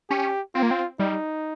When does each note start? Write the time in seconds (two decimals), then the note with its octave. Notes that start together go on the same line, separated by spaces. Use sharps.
0.10 C#4 G4
0.55 C4 F4
0.63 A#3
0.71 C4
0.99 G3 D#4